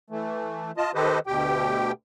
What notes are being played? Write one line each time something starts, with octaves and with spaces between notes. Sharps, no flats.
E3 A3
F4 D#5 A5
D#3 G4 A4 B4 C5 D#5
D2 B2 G4 G5